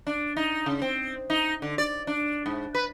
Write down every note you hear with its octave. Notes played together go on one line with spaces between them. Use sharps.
D4
D#4
C#3
C4
D#4
D3
D5
D4
G#2
B4